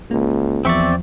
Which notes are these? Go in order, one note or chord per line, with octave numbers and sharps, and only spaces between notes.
C#2 A#3
E2 F3 C4 D5 E5 C#6